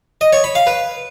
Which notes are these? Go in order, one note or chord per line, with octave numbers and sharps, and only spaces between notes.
D#5
C#5
B5
F5
B4